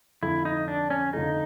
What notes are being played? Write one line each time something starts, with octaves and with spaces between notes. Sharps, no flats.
F2 D3 F3 A3 E4
D#4
D4
C#4
F2 D3 F3 A3 D#4